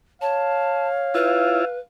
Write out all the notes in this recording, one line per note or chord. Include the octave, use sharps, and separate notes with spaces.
C#5 F5 A5
E4 F4 B4